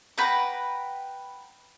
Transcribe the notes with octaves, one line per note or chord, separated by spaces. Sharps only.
B4 F#5 G5 A#5